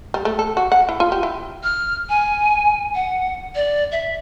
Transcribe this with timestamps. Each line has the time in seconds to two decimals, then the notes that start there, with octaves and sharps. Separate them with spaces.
0.14 G3
0.25 A3
0.39 A4
0.57 F#4
0.72 F#5
0.89 E4
1.00 F4
1.12 G4
1.23 E4
1.64 F6
2.09 G#5
2.95 F#5
3.55 D5
3.92 E5